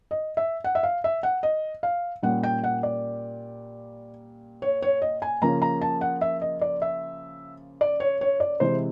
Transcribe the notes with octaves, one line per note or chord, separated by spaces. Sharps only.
D#5
E5
F#5
E5
F5
E5
F#5
D#5
F5
A#2 G3 A#3 C#4 F#5
G5
F#5
D5
C#5
C#5
D#5
G#5
C#3 F3 A#3 C#4 A#5
A#5
A5
F#5
E5
D#5
D5
E5
D5
C#5
C#5
D5
C3 E3 G#3 C5